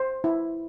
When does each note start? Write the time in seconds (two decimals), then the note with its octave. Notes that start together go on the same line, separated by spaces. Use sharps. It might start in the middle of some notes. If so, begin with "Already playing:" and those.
Already playing: C5
0.24 E4